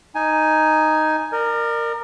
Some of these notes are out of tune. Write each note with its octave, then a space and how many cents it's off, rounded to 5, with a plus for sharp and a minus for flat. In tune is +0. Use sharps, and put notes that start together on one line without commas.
D#4 +0 G#5 +5
A#4 -5 D5 +40